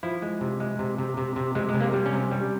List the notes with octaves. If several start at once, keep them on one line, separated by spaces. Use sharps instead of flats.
F3 E4
G#3
C3
G#3
C3
C3
C3
C3
C3 G#3
G#3
C3
A#3
G3
C#4
C3
G3